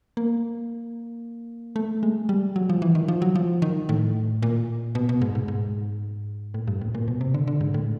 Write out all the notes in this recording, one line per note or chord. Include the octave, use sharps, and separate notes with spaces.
A#3
A3
G#3
G3
F#3
F3
E3
D#3
F3
F#3
F3
D#3
A2
A#2
B2
B2
G#2
G#2
G#2
A2
G2
A2
A#2
B2
C3
D3
D3
G#2
A2